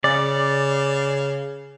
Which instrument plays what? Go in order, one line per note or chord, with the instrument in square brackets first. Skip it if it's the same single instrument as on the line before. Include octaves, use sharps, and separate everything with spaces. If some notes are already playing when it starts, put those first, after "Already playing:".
[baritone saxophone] C#3 [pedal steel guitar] D5